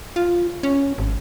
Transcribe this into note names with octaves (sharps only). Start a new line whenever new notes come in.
F4
C#4
G#1